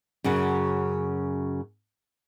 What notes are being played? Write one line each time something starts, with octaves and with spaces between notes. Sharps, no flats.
F#2 C#3 F#4